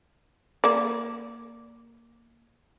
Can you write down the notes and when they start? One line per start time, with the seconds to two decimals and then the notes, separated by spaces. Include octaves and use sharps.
0.64 A#3 D5